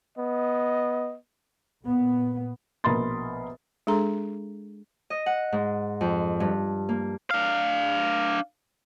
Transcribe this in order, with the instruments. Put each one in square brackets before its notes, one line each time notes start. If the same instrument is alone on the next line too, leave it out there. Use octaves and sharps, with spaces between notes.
[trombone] B3 [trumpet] D#5
[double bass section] A#2 B3
[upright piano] A#1 B2 A#4 B5 C6 A6
[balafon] G#3 D4 G#4 A4 A#5 C6
[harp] D#5
F#5
G#2
F2
G2
A#3
[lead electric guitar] D4 F5